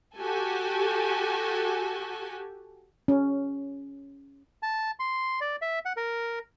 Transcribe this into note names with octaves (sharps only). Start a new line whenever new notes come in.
F#4 G4 A4 G#5
C#4
A5
C6
D5
E5
F#5
A#4